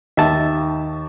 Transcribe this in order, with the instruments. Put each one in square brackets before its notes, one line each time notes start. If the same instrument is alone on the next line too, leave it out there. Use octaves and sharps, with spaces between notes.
[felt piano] D#2 [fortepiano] E5 A5